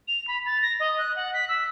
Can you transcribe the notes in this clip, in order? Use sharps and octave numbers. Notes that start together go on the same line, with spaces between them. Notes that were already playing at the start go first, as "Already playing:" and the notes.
F7
B5
A6
A#6
D#5
F#6
F#5
B6
E6